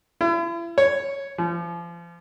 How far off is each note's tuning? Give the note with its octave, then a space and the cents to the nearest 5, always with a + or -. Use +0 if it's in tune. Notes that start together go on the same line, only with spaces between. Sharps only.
E4 +40
C#5 +0
F3 -35